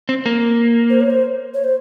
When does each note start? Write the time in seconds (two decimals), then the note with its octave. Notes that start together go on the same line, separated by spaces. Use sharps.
0.09 C4
0.26 A#3
0.90 C5
1.00 C#5
1.10 C5
1.54 C#5
1.64 C5